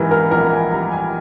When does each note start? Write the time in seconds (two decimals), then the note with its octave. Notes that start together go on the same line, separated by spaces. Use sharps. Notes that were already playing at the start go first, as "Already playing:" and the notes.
Already playing: G#2 E3 G4 A#4 B4
0.11 A#4
0.31 A#1 A#4
0.51 G#5
0.71 G3 A#5
0.92 G#5